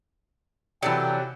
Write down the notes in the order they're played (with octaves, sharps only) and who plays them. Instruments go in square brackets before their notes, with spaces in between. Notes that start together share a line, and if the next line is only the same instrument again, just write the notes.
[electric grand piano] C3 C#7 [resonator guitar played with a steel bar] E3 A4 D5 [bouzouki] F#3 [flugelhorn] G5